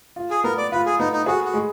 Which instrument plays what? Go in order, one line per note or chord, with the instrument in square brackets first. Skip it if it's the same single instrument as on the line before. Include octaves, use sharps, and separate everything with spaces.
[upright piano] F4
[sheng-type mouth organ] G#4
[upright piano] B3 [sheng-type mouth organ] A#4
[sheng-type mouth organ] D5
[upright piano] F4 [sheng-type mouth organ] B4
[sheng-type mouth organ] G#4
[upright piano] B3 [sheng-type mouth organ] D#4
[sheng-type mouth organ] D#4
[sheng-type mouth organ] F#4 [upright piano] G#4
[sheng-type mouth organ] F#4
[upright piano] G#3